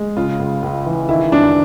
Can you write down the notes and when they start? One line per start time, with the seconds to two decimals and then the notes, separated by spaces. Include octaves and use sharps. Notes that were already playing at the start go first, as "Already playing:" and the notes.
Already playing: G#3
0.17 C#3 F4
0.40 C#2
0.63 C#2
0.86 E3
1.09 D#3 E4
1.32 F#2 D4